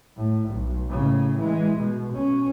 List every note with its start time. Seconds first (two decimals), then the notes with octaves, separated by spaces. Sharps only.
0.16 A2
0.49 B1
0.90 A2 C#3
1.39 E3 G#3
1.78 B2
2.13 B2 C#4